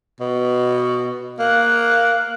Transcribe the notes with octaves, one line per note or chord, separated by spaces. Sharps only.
B2
A#3 F#6